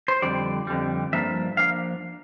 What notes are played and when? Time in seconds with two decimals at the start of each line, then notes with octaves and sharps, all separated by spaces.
0.08 C5
0.22 F2 D3 G3 D5
0.67 F2 D3 G3
1.13 G2 F3 A#3 D4 E5
1.57 F3 A#3 D4 F5